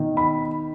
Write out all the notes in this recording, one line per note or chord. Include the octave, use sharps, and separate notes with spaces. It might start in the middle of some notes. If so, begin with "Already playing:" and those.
Already playing: B2 D#3
B5